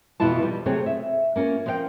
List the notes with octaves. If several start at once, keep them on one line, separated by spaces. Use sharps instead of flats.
F2 B2 E3 E4 F4 A5
F3 G3 D#4
C3 F#3 A3 C4 G#4 C#5
E5
A#3 C#4 F4 A#4
F3 A#4 C5 F5 G5